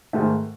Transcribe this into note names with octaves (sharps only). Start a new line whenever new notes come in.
G#2 D#3 A3